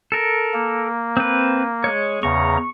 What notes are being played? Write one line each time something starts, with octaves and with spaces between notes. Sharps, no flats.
A4 A#4
A#3
C4 B4
G#3 C#5
E2 C#3 A#5 C#6